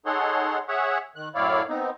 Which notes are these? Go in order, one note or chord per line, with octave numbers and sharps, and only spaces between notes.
D#4 G#4 A4 C#5 F#5 C6
G#4 C#5 E5 F#5
D#3 F#6
F#2 A2 E4 C#5 D5 F5
B3 C4 D#4